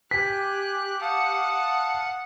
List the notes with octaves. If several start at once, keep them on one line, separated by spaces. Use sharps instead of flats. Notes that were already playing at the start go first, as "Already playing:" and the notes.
G4 G#5 F#6 B6
F5 F#5 A5 D#6